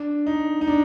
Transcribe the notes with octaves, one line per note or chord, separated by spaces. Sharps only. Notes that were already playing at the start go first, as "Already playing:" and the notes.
Already playing: D4
D#4
D#4
D4